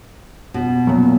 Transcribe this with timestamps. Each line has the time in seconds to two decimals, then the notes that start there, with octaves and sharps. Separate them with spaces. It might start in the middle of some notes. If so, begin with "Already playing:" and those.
0.54 B2
0.87 F#2 A#2